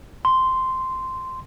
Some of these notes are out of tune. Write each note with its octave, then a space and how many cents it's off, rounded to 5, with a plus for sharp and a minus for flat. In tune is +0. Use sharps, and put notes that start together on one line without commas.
C6 -5